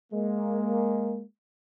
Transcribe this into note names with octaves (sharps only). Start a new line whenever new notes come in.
G#3 A#3